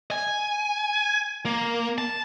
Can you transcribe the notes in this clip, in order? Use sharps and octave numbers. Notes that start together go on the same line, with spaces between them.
G#5
A#3
A5